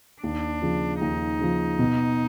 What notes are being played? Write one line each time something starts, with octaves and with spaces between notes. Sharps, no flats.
D#2 D4
C#3 F3
D#2 D#4
C#3 F3
B2